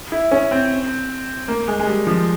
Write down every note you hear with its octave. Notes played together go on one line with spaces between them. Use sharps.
E4
C#4
C4
A#3
G#3
G#3
G3
F3